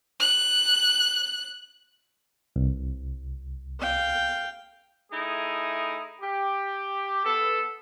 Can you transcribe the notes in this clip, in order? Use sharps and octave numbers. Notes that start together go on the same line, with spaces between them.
F#6
C2
F5 G5
A3 D#4 E4 G#4
G4
B3 A4